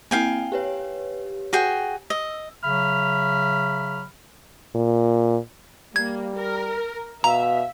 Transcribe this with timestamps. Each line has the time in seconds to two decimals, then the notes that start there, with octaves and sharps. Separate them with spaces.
0.11 A#3 C4 E4 F5 G5 G#5
0.52 G4 B4 C#5
1.53 F#4 G#4 G5
2.10 D#5 E6
2.63 C#3 F#3 E5 B5 F6
4.75 A#2
5.96 G3 A#3 G#6
6.36 A#4
7.24 B2 E5 F5 A#5